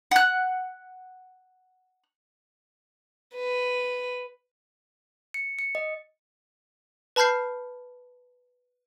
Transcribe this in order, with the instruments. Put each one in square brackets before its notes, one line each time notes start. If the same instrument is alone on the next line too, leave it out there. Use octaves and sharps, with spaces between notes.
[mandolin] F#5 F#6
[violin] B4
[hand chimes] C#7
C#7
D#5
[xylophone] B4 A5 B5 F6 G6 C7